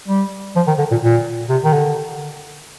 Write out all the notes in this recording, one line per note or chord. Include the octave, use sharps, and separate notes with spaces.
G3
F3
D#3
D3
A#2
A#2
C3
D#3
D3